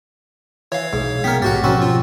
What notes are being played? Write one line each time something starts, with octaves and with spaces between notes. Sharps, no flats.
E3 C#5 F5
B1 G#2
B2 G#3 A3 B3 A#4 G5 B6
A1 G#2 F#4 G4 F#5 A6
B2 F3 F#3 C4 C#4 F#4
F4